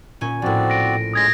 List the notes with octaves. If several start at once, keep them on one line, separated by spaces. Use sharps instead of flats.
A#2 C#4 G#5
A#1 A2 C4 F#4 D5
A#6 D7
G#3 C#4 D#6 G#6 A#6